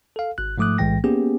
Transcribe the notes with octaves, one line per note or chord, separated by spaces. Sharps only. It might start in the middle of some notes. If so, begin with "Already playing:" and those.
A4 F5
G#1 F#6
G#2 F3 A3 D6 D#6 F#6
B1 A2 E3 G#3 G5 A#6
A#3 B3 C#4 G4 G#4